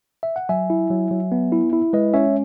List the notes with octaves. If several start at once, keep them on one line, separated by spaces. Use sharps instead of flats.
E5
F#5
F#3 E5 G#5
E4
F#3
F#3
B3
E4
E4
G#3 B4 D#5
C#4 C#5 E5